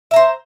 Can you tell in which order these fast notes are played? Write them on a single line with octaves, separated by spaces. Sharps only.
E5 A#5 C5